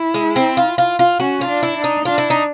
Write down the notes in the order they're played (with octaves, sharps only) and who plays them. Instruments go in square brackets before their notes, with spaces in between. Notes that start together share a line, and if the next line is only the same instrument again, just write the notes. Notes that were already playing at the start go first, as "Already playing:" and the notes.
Already playing: [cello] E4
[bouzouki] G#3
C4
F4
F4
F4
[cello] C#4 [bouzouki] F#4
[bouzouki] F4
[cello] D4
[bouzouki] E4
[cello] D4
[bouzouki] D#4
[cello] D4 [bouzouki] F4
[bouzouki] E4
D#4